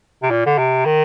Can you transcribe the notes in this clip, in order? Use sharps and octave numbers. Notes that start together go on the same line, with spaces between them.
C3
A#2
D3
C3
D#3